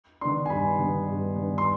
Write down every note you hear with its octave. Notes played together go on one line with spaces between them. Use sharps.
D#3 B3 D4 C6
G#5
G2 B5
D#3 B3 D4
G2
D#3 B3 D4
C6